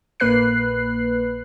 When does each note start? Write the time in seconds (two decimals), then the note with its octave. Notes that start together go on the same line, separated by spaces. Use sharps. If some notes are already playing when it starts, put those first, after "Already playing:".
0.20 A#1 A#3 B4 F#6 C7